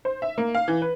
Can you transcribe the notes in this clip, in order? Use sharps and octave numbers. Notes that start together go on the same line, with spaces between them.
C5
E5
A#3
F5
E3
B4